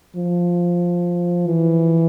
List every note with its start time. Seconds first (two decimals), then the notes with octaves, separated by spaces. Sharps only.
0.16 F3
1.46 E3